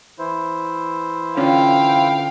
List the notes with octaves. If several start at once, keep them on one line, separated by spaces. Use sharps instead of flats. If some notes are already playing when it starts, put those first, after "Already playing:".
E3 E4 C5
D3 C#4 F4 F5 G5